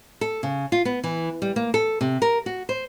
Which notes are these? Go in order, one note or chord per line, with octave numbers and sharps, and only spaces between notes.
A4
C#3
F4
B3
E3
G3
A#3
A4
C3
A#4
F#4
C5